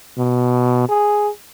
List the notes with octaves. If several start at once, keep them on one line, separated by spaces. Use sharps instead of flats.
B2
G#4